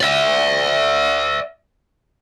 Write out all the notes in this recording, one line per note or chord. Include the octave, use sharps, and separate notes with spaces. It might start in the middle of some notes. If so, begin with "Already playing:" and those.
D5 E5